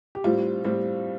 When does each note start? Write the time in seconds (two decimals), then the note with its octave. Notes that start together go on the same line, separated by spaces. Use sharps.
0.15 G4
0.24 A2 G3 C4 F4
0.64 A2 G3 C4